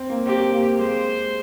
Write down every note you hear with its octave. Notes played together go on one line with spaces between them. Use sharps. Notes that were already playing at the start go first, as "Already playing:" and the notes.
Already playing: C4
A#3
C4 G4
A#3
G#3 C5